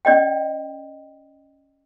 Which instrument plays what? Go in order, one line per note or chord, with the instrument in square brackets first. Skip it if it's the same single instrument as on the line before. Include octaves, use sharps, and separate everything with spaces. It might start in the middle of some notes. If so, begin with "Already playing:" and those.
[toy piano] C#4 D5 D#5 G5